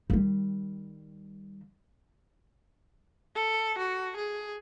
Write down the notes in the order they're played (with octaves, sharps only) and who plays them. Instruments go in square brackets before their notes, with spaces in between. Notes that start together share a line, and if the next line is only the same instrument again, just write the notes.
[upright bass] D#3 G3
[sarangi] A4
F#4
G#4